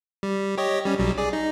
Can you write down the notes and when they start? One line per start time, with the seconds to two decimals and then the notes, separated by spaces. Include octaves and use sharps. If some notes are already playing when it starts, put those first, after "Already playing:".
0.23 G3
0.58 G4 C#5 D#5
0.85 G3 C#4
0.99 B1 F#3 G3
1.18 G#4 D5
1.33 D#4